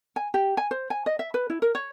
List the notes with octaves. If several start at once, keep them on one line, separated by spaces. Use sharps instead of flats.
G#5
G4
G#5
C5
G#5
D#5
E5
B4
E4
A#4
C#5